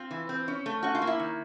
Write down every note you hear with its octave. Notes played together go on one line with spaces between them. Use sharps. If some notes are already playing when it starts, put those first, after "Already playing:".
Already playing: C4 F4
E3
C4
C#4
A3
C#4 F#4
F4
A#3
E4
D#3